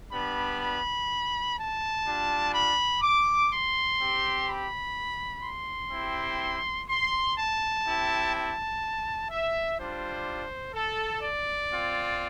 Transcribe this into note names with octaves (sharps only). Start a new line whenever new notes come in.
G3 B3 D4 B5
B5
A5
G3 D4 F4
B5
D6
C6
C4 G4
B5
C6
C4 E4 G4
C6
A5
C4 E4 G4
A5
E5
G3 D4 F4 C5
A4
D5
C4 F4